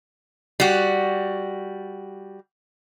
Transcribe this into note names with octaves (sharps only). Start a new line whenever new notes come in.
G3 F#4